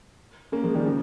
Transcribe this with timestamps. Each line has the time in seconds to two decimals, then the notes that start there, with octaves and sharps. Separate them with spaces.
0.52 A#3 C#4
0.64 F3 G#3
0.75 D#3 G3
0.85 C#3 F3